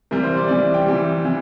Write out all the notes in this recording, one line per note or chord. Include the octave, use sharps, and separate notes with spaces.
C3 E3 G3 A#4
C5
D5
C3 E3 G3 D5
G5
C3 E3 G3
C3 E3